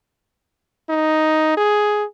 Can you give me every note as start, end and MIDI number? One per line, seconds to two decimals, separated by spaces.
0.90 1.52 63
1.57 2.04 68